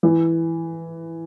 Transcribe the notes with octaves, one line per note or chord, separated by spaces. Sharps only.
E3